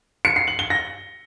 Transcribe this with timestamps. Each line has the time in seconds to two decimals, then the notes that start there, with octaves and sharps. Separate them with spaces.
0.25 C#7
0.36 C7
0.48 F#7
0.59 G7
0.70 A#6